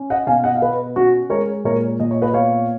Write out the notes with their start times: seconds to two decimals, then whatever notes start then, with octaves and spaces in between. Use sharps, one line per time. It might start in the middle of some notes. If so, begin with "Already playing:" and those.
Already playing: C#4
0.10 D#5 F#5
0.27 B2 F5 G#5
0.44 D#5 F#5
0.55 F5
0.61 B2 B4 D#5
0.96 C#4 F#4
1.30 G#3 A#4 C#5
1.64 A#2 A#4 C#5
2.00 A#2 D#5
2.11 C#5
2.22 B4 D#5
2.34 B3 C#5 F5